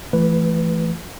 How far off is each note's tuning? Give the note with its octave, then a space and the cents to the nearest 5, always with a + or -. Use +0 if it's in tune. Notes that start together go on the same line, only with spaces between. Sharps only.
E3 +30 A3 +0 B4 +0